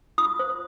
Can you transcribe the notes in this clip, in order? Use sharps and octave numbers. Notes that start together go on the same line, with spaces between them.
F4 D#6
C5